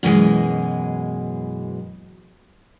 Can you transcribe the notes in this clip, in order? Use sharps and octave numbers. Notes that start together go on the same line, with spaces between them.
F#2 B2 E3 G#3